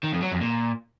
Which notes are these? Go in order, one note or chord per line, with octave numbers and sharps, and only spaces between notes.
D#3
F2
F#3
F2
A#2